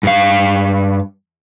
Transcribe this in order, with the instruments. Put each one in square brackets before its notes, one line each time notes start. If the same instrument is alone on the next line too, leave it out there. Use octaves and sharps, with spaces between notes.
[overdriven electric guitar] G2 F5